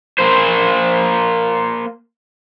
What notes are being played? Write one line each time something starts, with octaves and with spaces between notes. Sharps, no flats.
A#3 C5